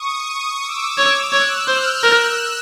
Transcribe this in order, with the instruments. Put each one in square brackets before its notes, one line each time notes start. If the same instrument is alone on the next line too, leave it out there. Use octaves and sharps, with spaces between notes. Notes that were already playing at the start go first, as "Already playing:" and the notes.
Already playing: [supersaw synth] C#6 D#6
D6 E6
[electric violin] C#5
[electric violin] C#5 [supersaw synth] E6 F#6
[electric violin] C5 [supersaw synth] F6 G6
[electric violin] A#4 [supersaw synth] E6 F#6